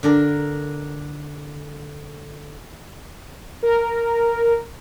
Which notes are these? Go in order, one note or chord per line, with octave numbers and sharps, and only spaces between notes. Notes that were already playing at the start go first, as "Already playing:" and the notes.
D3 D4 A#4
A#4